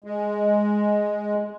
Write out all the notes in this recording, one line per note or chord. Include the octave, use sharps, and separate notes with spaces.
G#3